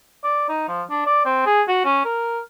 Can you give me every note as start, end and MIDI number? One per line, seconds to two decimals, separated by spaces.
0.24 0.47 74
0.49 0.67 63
0.68 0.82 53
0.90 1.04 62
1.06 1.23 74
1.25 1.42 60
1.46 1.62 68
1.68 1.81 66
1.85 2.02 61
2.05 2.40 70